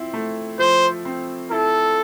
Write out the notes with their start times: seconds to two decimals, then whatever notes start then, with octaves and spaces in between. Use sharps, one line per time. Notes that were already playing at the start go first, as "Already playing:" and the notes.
Already playing: F3 C4 E4
0.14 A3
0.59 F3 C5
1.05 C4
1.51 E4 A4